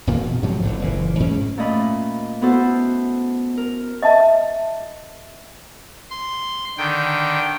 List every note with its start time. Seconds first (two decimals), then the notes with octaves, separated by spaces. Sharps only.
0.07 E1 A#2 D#3 A#3
0.21 B2
0.42 G#2 C3 F3 F#3
0.62 F#1 A2 D3
0.81 F#1 A#2 E3
1.20 G#2 C#4
1.58 A#2 A3 C#4 D#5 B5
2.42 B3 E4 F#4 A4 C5
3.58 A#4
4.03 D#5 E5 A5
6.10 C6
6.78 D3 D#3 G5